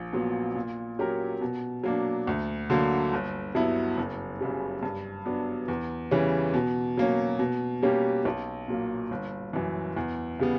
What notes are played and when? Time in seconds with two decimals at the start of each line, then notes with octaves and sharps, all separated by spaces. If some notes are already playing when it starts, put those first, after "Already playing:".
Already playing: A#1
0.13 A#2 F#3 B3
0.56 A#2
0.99 F#3 C#4 G4 A#4
1.41 B2
1.84 F#3 A#3 D4
2.27 D2
2.70 D3 F#3 A#3
3.13 G1
3.55 G2 F#3 B3 E4
3.97 F#1
4.41 F#2 C#3 G3
4.83 G2
5.26 F#3 B3 D4
5.68 E2
6.11 C#3 E3 G3 C#4
6.54 B2
6.98 F#3 A#3 C#4
7.39 B2
7.83 G3 A#3 C#4 G4
8.25 B1
8.68 A#2 F#3 A#3
9.11 G1
9.53 F#2 E3
9.96 E2
10.39 C#3 G3 B3